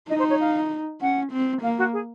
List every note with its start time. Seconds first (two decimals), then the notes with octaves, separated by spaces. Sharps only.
0.09 D#4 D#5
0.19 C5
0.29 C#5
0.40 F5
1.01 C#4 F#5
1.32 C4
1.62 A#3 F5
1.78 F#4
1.93 G#4